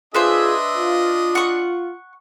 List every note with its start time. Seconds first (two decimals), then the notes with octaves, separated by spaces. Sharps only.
0.14 D4 F4 G#4 B4 C5 D#5 E5
0.77 F4
1.35 F#5 C#6